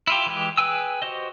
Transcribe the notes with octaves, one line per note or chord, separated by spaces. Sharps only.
E4 F4 G4
E3 G#3 G4
G#4 B4 G5 G#5 E6
F#4 G4 C5 D#5